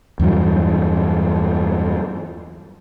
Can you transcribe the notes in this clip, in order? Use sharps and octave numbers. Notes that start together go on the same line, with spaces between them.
E2 G2 E3 F#3